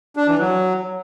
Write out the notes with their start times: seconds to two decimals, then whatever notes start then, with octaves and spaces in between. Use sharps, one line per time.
0.16 D4
0.28 E3
0.39 F#3